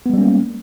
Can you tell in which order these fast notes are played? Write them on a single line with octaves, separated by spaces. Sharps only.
B3 G#3 G3 C#4 A#3